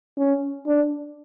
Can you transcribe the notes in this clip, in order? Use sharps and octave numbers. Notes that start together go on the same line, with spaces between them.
C#4
D4